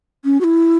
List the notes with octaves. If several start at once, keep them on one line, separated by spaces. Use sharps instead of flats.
C#4
F#4
E4